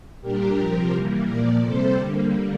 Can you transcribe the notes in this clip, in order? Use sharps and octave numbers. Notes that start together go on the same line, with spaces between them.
A#2 G3 D4 G4 A#4
C3 F3 C4 G4 A#4
E3 G3 A#3
A#2 F3 A#3 A#4 D5
C3 G3 C4 A4 C5
D3 G3 A#3